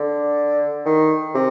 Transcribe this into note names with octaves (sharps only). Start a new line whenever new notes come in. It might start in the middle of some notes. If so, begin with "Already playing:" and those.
Already playing: D3
D#3
C3